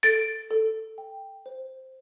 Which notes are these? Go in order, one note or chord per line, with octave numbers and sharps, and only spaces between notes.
A4 A6 D7
A4
G5
C5